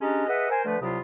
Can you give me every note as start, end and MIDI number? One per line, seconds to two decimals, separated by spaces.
0.01 0.26 56
0.01 0.26 61
0.01 0.26 62
0.01 0.26 67
0.01 0.26 75
0.01 0.26 82
0.28 0.50 68
0.28 0.50 71
0.28 0.50 75
0.28 0.50 76
0.28 0.50 78
0.28 0.50 87
0.50 0.62 70
0.50 0.62 72
0.50 0.62 80
0.65 0.77 50
0.65 0.77 53
0.65 0.77 57
0.65 0.77 71
0.81 0.99 36
0.81 0.99 48
0.81 0.99 54
0.81 0.99 65
0.81 0.99 83
0.81 0.99 87